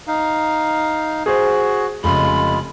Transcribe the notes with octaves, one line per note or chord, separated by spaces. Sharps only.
D#4 F5
F#4 G#4 C5
F1 C#3 G#3 F4 B5